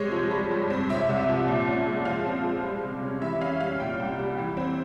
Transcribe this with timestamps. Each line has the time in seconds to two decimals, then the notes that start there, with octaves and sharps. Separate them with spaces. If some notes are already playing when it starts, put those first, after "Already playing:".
Already playing: C3 G#3 C4 C#5
0.12 F3
0.31 G3
0.51 G2
0.70 C4
0.89 C3 E5
1.09 C2
1.28 F3
1.48 A#2
1.67 C#4
1.87 G#3
2.05 F3 F5
2.25 C4
2.44 G#3
2.64 G3
2.83 C3
3.03 C#4
3.21 E3 E5
3.41 C#4 F5
3.60 G3 F5
3.80 A#2 G5
3.99 C2
4.19 G3
4.38 E3
4.57 C4